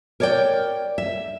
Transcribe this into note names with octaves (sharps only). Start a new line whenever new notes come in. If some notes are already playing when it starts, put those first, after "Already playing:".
A#4 C#5 D5 F#5 G5
E5